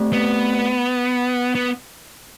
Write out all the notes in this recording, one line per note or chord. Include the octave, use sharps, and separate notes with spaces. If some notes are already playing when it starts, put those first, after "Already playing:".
Already playing: A3 C4 G4 D5
B3
B3